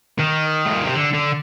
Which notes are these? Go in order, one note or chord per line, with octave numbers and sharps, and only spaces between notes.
D#3
A2
A#2
C3
D3
D3